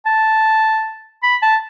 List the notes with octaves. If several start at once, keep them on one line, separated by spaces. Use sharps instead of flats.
A5
B5
A5